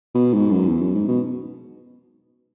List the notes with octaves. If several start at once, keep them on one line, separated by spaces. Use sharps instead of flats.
B2
G#2
F#2
E2
F#2
G#2
B2